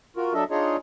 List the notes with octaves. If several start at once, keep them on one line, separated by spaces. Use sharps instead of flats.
F4 F#4 A#4
F#3 D4 A4 D#5 E5
D4 D#4 F4 G#4 C#5 D#5